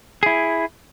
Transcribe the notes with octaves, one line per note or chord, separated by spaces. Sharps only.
E4 G#4